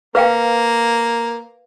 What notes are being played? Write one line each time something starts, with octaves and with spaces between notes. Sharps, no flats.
A#3 B4 F5 G5